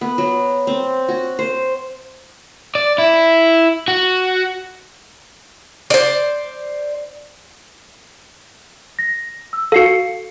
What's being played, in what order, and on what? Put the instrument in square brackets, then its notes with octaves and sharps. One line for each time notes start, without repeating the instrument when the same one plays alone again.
[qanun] B3
F#3
C4
F#4
C5
[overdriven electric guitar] D5
E4
F#4
[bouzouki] C5 D5
[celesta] A#6
E6
[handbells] F#4 A4 [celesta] F5 C7 C#7